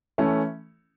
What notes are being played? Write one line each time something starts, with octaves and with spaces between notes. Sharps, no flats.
E3 A3 C#4 E4